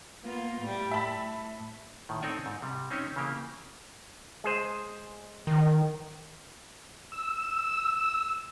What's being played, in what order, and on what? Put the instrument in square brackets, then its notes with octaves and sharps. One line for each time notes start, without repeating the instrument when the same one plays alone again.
[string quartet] A#3 B3 F4
A2 G3
[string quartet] A2 [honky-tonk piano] E5 A5 B5
[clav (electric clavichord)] A2 D#3
C4 D#4 A4 C#5 D5 G#5
G#2
C3 G3
C4 C#4 D#4 G4 C5 C#5
C#3 E3 A#3 G4
G#3 G#4 C5
[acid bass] D#3
[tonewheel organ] E6